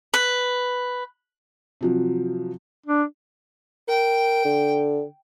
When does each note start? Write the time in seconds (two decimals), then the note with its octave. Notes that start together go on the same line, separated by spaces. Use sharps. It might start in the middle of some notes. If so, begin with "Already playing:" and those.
0.14 B4
1.81 C3 F3 F#3
2.86 D4
3.88 A#4 G5
4.45 D3